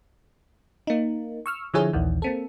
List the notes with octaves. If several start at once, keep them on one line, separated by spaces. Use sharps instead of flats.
A#3 D#4
C#6 E6 F6
D3 F3 E4 G#4 C#5
A#1 D#2 D#3 E3
A#3 C4 A4